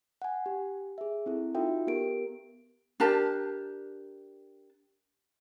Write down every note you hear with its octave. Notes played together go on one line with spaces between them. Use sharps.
F#5 G#5
G4
G#4 E5
C4 E4 A4
D#4 F4 F#4 A4 E5 G5
B3 G4 A#4 D7
D4 G4 A#4 A5